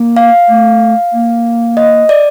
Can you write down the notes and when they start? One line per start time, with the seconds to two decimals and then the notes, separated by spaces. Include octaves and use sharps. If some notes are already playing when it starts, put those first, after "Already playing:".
Already playing: A#3
0.16 F5
0.49 A3
1.13 A#3
1.77 D#5
2.09 D5